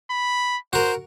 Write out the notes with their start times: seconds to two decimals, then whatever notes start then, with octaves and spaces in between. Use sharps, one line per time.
0.11 B5
0.73 F#4 A#4 C5